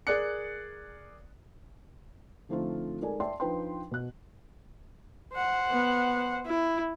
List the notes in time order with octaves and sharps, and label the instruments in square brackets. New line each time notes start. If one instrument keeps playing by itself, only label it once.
[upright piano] G#4 A#4 D5 F#6 C#7
[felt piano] D3 F3 A3 C4 D#4 F4
G#3 D#4 A4 A#4 D5 G#5
D5 E5 G5 A5 C6
F3 D4 D#4 B4 G5 C6
B2 F#6
[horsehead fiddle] C5 F#5
[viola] B3
E4